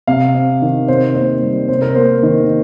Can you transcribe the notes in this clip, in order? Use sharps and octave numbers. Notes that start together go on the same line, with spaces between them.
C3 F5
C4
D#3
C3 C5
A#3 C5
G3
C3 C5
A#4
A#3 C5
D#3